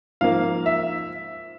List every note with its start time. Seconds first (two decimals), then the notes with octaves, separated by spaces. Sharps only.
0.21 G#2 F3 A#3 F5
0.66 E5